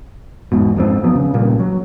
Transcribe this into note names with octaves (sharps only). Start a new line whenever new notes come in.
E1 G#2 B2
F2 G#2 G#3 C4
F3 F#3 B3
C#3
A#2 C#3 G3 A#3
F#3